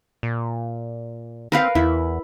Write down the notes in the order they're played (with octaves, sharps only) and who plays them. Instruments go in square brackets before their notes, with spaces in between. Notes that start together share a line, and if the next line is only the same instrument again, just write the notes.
[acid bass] A#2
[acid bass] C4 [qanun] A#4 B4 F5
[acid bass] E2 [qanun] E4